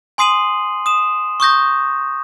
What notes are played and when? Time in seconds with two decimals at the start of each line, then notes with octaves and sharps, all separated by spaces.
0.18 G#5 C6 D#6 C7 D#7 F#7
0.86 D#6 E7
1.40 C#6 D#6 G6 A#6